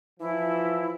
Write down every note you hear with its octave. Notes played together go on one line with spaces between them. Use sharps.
E3 F3 E4